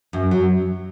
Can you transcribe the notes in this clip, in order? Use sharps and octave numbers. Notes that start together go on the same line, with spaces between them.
F#2
F#3